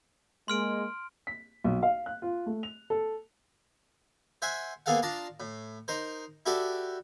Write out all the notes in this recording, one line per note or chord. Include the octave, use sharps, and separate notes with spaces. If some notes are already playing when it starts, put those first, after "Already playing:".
G#3 A#3 C6 F6 D7
B6
B1
F5
F#6
F4
A3
F7
A4
C5 E5 F#5 G#5
A#3 B3 G#4 A4 F5 F#5
D4 F4 A5 A#5 D#6
A2
D#4 A#4 C5
E4 F#4 G4 A4 D5